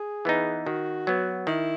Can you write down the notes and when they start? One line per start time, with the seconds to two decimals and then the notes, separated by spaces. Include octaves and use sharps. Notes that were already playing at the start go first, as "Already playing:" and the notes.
Already playing: G#4
0.25 E3 B3 D#4
0.66 D#3 F#4
1.07 F#3 B3
1.47 D#3 E4